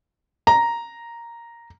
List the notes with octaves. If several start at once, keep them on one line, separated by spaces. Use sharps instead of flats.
A#5